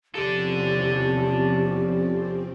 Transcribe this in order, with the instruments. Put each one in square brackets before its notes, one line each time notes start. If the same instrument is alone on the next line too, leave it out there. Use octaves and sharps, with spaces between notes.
[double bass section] E2 C3 C#4 [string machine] F3 C4 [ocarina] G4 [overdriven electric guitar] A4 D5